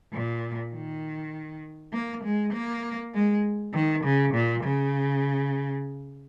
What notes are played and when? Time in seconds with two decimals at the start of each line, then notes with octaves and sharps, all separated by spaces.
0.13 A#2
0.73 D#3
1.93 A#3
2.24 G#3
2.53 A#3
3.14 G#3
3.74 D#3
4.04 C#3
4.34 A#2
4.63 C#3